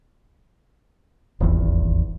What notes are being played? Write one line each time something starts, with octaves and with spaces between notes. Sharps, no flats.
D#1 G#1 E2